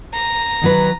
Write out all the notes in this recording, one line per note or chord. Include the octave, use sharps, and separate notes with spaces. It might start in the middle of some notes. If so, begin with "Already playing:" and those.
A#5
D#3 F#3 B4